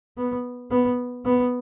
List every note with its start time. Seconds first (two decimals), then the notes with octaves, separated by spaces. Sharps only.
0.17 B3
0.71 B3
1.26 B3